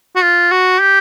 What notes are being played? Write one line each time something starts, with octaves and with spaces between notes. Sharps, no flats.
F#4
F4
F#4
G4